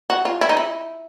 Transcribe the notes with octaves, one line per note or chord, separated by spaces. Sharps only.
F#4
F4
E4
D#4
E4